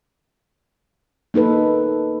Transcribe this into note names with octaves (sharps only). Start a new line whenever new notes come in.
A#3 D#4 A4 B4